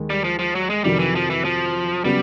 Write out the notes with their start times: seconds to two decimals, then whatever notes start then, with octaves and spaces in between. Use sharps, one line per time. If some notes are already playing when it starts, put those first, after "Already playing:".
Already playing: D#2 D#3 G#3
0.10 G3
0.24 F3
0.39 F3
0.55 F#3
0.70 G#3
0.84 F2 C3 D#3 F#3 G3
0.99 E3
1.15 F3
1.30 E3
1.45 F3
2.05 C#3 F#3 G3 B3